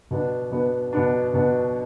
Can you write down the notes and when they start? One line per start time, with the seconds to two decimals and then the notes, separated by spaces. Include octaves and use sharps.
0.11 B2 B3 D4
0.51 B2 B3 D4
0.93 B2 B3 D4
1.34 B2 B3 D4